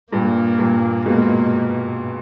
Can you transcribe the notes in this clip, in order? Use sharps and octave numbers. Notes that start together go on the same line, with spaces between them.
G2 A#2 A#3
G2 A#2
G#2 B2 A#3